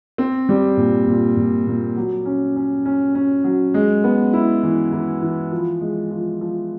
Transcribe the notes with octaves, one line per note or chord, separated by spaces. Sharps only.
C4
G3
A#2
A#2
A#2
A#2
F#3
C#4
C#4
C#4
C#4
F#3
G#3
B3
E4
E3
E3
E3
F3
G#3
F3
F3